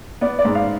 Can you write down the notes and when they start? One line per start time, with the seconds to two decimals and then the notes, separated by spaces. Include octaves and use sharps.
0.21 B3 D5
0.39 D5
0.45 G#2
0.55 F5